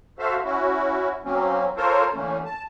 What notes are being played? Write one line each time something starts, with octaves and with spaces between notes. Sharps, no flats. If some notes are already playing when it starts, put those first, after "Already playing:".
F#4 A4 C5 E5 F5
C#4 E4 F#4
F#3 A#3 C4 C#4
F4 A4 A#4 C5 C#5
D3 E3 A3 A#3 C#4
A5